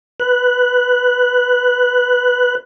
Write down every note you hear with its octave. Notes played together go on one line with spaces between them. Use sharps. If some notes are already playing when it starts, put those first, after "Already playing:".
B4 F#6